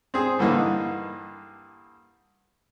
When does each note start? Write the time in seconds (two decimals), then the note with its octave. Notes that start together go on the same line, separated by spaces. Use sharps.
0.14 C4 G#4
0.39 G2 D3 E3 A#3 D#4